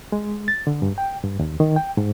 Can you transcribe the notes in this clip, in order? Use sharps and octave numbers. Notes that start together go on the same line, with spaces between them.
G#3
A6
D3
G2
G5
G2
D#2
D#3
G5
G#2